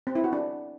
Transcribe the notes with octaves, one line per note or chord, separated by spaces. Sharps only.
C4
E4
F#4
D4